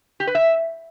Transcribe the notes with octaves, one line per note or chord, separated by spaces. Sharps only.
G4
B4
E5